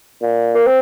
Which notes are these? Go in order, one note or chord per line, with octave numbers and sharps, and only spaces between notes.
A#2
A#3
C4